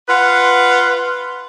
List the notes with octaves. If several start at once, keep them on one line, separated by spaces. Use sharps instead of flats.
F4 B4 F#5